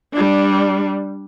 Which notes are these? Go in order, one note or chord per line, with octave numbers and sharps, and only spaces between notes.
G3 D4